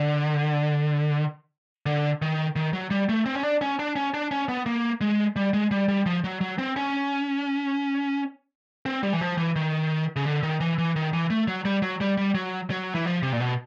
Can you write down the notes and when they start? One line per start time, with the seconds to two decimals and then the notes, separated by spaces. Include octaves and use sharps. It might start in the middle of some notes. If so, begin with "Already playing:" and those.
Already playing: D3
1.86 D3
2.22 D#3
2.56 D#3
2.73 F#3
2.91 G3
3.09 A3
3.26 C4
3.35 C#4
3.43 D4
3.61 C#4
3.79 D4
3.96 C#4
4.14 D4
4.31 C#4
4.49 B3
4.66 A#3
5.01 G#3
5.36 G3
5.53 G#3
5.71 G3
5.88 G3
6.06 F3
6.24 F#3
6.41 F#3
6.58 C4
6.76 C#4
8.86 C4
9.03 G3
9.13 E3
9.21 F3
9.38 E3
9.56 D#3
10.16 C#3
10.25 D3
10.43 D#3
10.60 E3
10.78 E3
10.96 D#3
11.13 E3
11.30 A3
11.48 F#3
11.65 G3
11.82 F#3
12.01 G3
12.18 G3
12.35 F#3
12.70 F#3
12.95 E3
13.05 F3
13.23 C3
13.32 A#2
13.40 B2